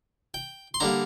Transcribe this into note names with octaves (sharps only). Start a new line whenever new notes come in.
G5
C6
D3 G3 A#3 A#5